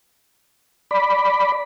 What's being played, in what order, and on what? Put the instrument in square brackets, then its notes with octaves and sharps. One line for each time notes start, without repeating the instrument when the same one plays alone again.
[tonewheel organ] D5 B5